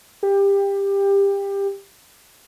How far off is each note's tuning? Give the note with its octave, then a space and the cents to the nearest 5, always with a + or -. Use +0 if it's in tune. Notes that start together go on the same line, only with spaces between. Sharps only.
G4 +20